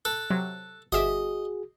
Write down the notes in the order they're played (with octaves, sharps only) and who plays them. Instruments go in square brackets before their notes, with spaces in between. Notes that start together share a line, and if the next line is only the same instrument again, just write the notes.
[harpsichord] A4 [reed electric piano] F#6
[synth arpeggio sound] C3 F#3
[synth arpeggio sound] G1 E5 D6 [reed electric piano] F#4 G#4 [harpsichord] D#5